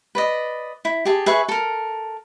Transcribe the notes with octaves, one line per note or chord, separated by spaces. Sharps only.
B4 D5 D#5
E4
G4 G#4 A5
G#4 B4 E5 C#6
A4 A#4